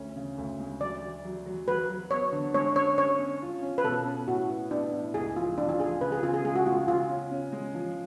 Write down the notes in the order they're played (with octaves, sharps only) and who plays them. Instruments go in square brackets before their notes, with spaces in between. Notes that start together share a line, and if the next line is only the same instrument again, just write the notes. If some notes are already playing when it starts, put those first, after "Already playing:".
Already playing: [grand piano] D2 C#4
C#3
D2
G#3
[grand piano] F#3 [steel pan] D5
[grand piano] F#3
F#3
F#3
[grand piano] F#3 [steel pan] B4
[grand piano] F#3
[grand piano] B3 [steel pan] C#5
[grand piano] D3
[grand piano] G#3 [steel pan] C#5
[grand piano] C#4 [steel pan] C#5
[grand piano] C#4 [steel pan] C#5
[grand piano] C#4
F4
C#4
[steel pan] B4
[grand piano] B2 [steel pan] A4
[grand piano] C#4
[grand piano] A2 [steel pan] F#4
[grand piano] B3
[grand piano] B3 [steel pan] D4
[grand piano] A2
[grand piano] C#2 [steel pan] G#4
[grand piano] F3 [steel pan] F4
[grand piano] F3 [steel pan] D4
[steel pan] F4
[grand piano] F3 [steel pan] G#4
[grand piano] C#3 [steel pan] B4
[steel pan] G#4
[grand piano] C#3 [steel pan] F4
[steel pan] G#4
[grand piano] G#3 [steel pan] G#4
[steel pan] F#4
[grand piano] G#3 [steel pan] F4
[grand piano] C#3 [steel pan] F4
[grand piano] C#4
C#4
G#3
F3